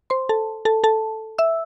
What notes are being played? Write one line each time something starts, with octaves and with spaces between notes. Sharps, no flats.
C5 C6
A4 A5
A4 A5
A4 A5
E5 E6